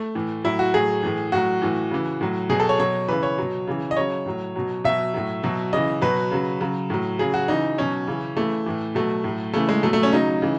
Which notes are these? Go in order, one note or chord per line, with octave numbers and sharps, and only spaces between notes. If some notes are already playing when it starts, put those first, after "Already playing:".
Already playing: A3
A2 E3
A2 F#3 E4
F#4
A2 F#3 G#4
A2 E3
A2 F#3 F#4
A2 E3
C#3 E3
A2 F#3
B2 F#3 G#4
A4
C#5
B2 F#3 C#5
C#3 E3 B4
C#5
B2 F#3
C#3 E3
D#5
C#3 F#3 C#5
A2 F#3
B2 F#3
B2 F#3 E5
A2 F#3
B2 F#3
C#3 E3 D#5
B2 F#3 B4
C#3 F#3
C#3 F#3
A2 F#3
C#3 F#3 G#4
F#4
C#3 E3 D#4
B2 F#3 C#4
C#3 E3
C#3 E3 A3
A2 E3
B2 F#3 A3
A2
F#3
C#3 E3 A3
G#3
B2 F#3 A3
A3
C#4
C#3 F#3 D#4
C#3 E3